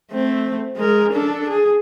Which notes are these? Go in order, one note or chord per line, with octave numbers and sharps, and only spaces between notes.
A3 C4
G#3 A#4
D4 A4
G#4